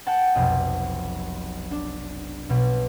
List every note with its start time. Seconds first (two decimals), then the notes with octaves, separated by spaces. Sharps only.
0.07 F#5 G5 A5
0.35 F1 B1 D#5
1.71 D4
2.49 B1 B2